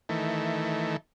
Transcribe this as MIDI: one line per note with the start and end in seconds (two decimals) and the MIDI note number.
0.09 0.97 51
0.09 0.97 52
0.09 0.97 57